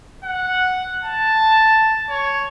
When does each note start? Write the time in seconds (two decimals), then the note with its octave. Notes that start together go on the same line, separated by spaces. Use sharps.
0.24 F#5
1.04 A5
2.10 C#5